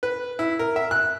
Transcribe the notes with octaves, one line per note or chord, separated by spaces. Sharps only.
B4
E4
A#4
E5
F#6